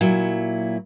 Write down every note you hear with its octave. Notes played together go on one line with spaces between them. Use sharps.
A#2 F#3 E4